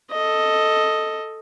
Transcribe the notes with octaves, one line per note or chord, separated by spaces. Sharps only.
A4 D#5